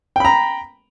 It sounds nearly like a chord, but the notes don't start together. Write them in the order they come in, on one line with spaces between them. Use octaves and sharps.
G5 B5 A#5